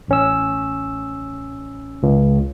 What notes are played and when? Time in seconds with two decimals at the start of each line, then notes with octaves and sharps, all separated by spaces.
0.08 A1 C#4 E6
2.03 C#2